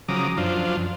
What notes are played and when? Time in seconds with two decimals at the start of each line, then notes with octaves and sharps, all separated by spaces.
0.09 C#3 F3 F#3 A#5 D6 D#6
0.38 F#2 F3 D4 F4 C5